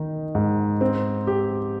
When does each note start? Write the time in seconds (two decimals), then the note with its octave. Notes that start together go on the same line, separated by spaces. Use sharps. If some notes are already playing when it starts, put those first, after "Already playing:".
Already playing: D#3 D#4
0.35 G#2
0.81 C4
1.27 G4